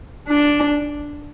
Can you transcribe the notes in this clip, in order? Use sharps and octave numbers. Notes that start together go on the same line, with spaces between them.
D4